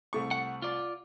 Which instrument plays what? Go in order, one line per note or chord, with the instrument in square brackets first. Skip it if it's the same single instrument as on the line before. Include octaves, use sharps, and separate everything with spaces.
[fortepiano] C2 A3 C#6
[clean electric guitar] F#5
F4 D5